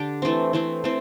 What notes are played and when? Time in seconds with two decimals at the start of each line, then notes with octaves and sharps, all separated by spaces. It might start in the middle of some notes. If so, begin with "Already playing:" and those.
Already playing: D3 D4 G4
0.22 E3 A3 C4
0.53 E3 A3 C4
0.84 E3 A3 C4